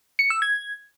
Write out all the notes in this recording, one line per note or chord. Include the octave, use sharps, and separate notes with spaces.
C#7
E6
G#6